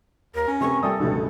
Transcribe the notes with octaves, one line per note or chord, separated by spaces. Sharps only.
D#2 A#4
C#4
C3 C4 B4 C#6
G3 A3 A4 D5 G5 G#5 D#6
C#2 G2 B2 D3 E3 A3